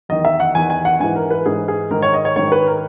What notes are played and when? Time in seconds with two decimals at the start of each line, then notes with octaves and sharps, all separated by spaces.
0.09 E2 D#3 D#5
0.25 E5
0.40 F#5
0.55 E2 D#3 G#5
0.70 G#5
0.85 F#5
1.00 G#2 E3 G#5
1.16 A#4
1.31 B4
1.46 G#2 E3 G#4
1.68 G#4
1.91 G#2 D#3 A#4
2.02 C#5
2.14 D#5
2.25 C#5
2.36 G#2 D#3 C#5
2.52 B4
2.67 A#4